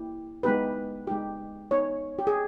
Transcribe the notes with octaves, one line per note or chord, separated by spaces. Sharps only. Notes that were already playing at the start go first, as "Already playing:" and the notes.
Already playing: A#3 E4 G4
G#3 B3 D#4 G4 B4
G#3 D#4 G4
B3 D#4 G4 C#5
G4
G#4